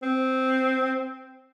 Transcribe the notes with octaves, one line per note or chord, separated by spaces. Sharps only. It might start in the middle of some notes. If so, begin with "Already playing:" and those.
C4